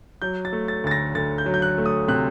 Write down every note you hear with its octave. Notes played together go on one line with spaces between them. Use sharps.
F#3 G6
A6
A3
A6
D2 A6
A#6
D2 A6
G6
F#3
G6
F#6
A3
D#6
C3 F#6